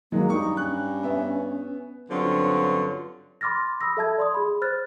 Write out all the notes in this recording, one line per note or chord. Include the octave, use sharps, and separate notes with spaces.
D#3 F#3 G#3 A#3
G2 D#4 C#6
C#4 F#6
B3 E5
G2 D3 F#3 C4 C#4 F4
B5 C6 D6 F6 A6 A#6
B5 D#6 E6 A#6
A4 E5 A5 G#6
D5 C6 D#6
G#4 B5
C5 F6 F#6 A6